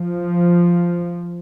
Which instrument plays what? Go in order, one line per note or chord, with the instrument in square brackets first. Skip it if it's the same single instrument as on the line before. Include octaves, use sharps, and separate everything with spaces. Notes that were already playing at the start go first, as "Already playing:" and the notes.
Already playing: [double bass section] F3